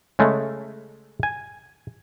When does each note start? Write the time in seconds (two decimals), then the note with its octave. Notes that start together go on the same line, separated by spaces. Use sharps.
0.19 C#3 G#3 A3
1.23 G#5